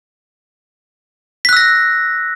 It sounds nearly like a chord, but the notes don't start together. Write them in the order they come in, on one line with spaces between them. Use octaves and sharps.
B6 F#6 E6 A#6